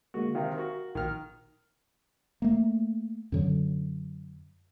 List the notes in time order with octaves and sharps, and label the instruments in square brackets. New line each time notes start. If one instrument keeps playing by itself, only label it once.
[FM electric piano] D3 G#3 A#3 [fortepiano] F#4
[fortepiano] C3 D#3 [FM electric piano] F5
[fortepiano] F#4 A#4
[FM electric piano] A#1 [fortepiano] D#3 F6
[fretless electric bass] A3 A#3
F#2 D3 F#3